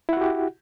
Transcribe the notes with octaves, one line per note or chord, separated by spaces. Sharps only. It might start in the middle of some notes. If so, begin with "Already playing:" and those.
E4 F#4 G4 F#5